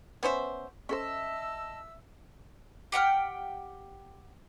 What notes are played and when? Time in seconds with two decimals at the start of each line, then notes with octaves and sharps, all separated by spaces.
0.23 B3 C#4 C5 E5
0.89 C#4 A4 C5 D#5 E5 A5 E6
2.92 G4 F#5 G5 F6